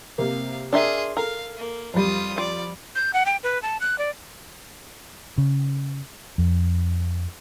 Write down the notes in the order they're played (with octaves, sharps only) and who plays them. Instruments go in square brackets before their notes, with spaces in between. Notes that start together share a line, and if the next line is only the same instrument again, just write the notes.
[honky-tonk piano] C3 A#3 [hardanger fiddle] F5
[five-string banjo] D4 A#4 E5 [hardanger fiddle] G#4 C6
[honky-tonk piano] A4 [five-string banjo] A#4 [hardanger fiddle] F5
[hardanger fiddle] A#3
[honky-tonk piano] F2 G3 [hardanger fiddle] F4 D#6
[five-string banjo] F4 [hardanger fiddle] D5
[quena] G6
F#5
G5
B4
A5
F#6
D5
[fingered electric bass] C#3
F2